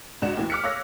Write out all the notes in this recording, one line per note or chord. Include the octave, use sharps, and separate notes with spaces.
C#2 G#2 D4 F#4 F#5 E7
D#2 A2 E3
D6 F6 F#6 B6 C#7
C#5 F5 E6 F#6 A#6